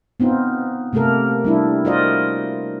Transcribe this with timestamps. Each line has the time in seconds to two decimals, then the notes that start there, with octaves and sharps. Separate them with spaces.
0.20 B3 C4 D#4 F4
0.93 C3 A3 A#3 A4 A#4
1.44 G3 D4 E4
1.85 F4 F#4 A#4 C5 D5 D#5